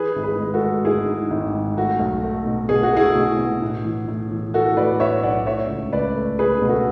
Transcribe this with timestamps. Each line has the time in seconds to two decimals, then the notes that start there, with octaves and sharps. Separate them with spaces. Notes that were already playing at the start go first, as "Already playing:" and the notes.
Already playing: E3 G#4 B4
0.16 G#1
0.23 G#4 B4
0.38 G#3
0.54 F#4 A4
0.62 G#3
0.85 G#2 E4 G#4
1.08 G#2
1.31 G#1
1.54 G#2
1.77 A3 F#4
2.00 B1
2.24 A3
2.46 B2
2.69 B2 G#4
2.83 F#4
2.93 A3 E4 G#4
3.15 B2
3.39 B2
3.62 A2
3.85 E3
4.08 A2
4.31 E3
4.54 E3 F#4 A4
4.77 A2 B4 D5
5.00 A2 C#5 E5
5.23 B1 D5 F#5
5.46 A3 C#5 E5
5.69 C#2
5.92 C#2 B4 D5
6.16 A3
6.39 C#2 G#4 B4
6.62 B2
6.69 F#4 A4